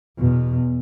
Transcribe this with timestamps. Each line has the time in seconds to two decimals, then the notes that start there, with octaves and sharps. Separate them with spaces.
0.17 E2 B2